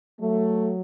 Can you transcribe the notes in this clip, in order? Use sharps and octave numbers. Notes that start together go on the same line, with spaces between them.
F#3 A3